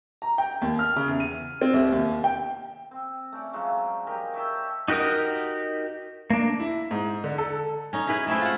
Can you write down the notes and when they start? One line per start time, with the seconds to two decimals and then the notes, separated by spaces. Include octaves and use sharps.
0.22 A#5
0.38 G5
0.62 D#2
0.79 F6
0.96 C#3
1.08 E2
1.20 D#7
1.61 C4
1.73 C2
1.92 D#2
2.24 G5
2.91 C4
3.32 A3 C#4 D5
3.53 F3 F#3 G#3 F4
4.07 G4 A#4 D#5
4.34 C#5 E5 G5 A5
4.88 D#4 F#4 G4 A#4 D#6
6.30 A#3 D4
6.60 E4
6.91 G#2
7.24 D3
7.38 A4
7.93 C#4 D#4
8.07 D#4 E4 G#4 B4
8.27 G#3 A3 C4 E4
8.41 F4 F#5